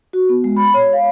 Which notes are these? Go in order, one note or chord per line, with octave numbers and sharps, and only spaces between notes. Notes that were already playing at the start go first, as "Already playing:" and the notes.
F#4
B3
G#3
B5
C#5
F5